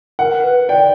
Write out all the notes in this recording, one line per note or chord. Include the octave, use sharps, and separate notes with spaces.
A#4 F#5
B4
D5 G5